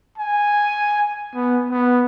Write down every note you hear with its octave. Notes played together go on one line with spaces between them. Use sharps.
G#5
B3
B3